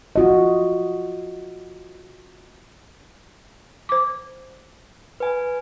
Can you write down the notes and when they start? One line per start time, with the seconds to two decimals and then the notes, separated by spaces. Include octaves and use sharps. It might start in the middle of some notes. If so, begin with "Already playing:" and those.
0.16 F4 F#4 D#5
3.89 C5 D6
5.20 B4 G#5